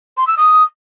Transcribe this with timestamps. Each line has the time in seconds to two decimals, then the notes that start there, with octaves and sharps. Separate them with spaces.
0.17 C6
0.27 E6
0.37 D#6